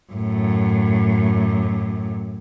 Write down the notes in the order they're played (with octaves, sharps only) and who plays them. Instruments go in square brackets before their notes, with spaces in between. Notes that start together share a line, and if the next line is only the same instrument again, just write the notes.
[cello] F#2 A2